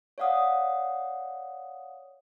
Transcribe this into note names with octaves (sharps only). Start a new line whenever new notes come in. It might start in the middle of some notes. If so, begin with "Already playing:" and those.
C#5 D5 F5 F#5 D#6